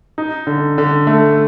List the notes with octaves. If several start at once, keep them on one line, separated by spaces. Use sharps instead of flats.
D#4
D3
D3
A3